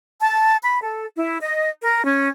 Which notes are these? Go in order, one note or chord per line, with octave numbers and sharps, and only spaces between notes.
A5
B5
A4
E4
D#5
A#4
C#4